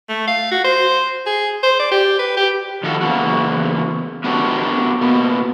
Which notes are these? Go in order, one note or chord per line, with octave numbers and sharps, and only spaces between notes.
A3
F5
F#4
C5
G#4
C5
D5
G4
B4
G4
D#3 F3 F#4 A4 A5
E2 C#3 A#3 F#4
B3 D4 F#4 G4 A#4 C#5
B2 A#3 B3